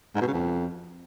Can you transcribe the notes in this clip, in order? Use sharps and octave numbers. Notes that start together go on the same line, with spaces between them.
G#2
B2
C#3
F2